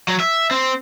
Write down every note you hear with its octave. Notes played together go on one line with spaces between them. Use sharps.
F#3
E5
C4